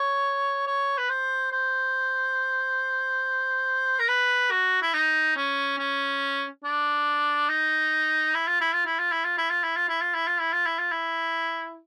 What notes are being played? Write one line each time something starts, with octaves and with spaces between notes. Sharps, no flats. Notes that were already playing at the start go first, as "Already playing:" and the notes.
Already playing: C#5
C#5
B4
C5
C5
A#4
B4
F#4
E4
D#4
C#4
C#4
D4
D#4
E4
F4
E4
F4
E4
F4
E4
F4
E4
F4
E4
F4
E4
F4
E4
F4
E4
F4
E4
F4
E4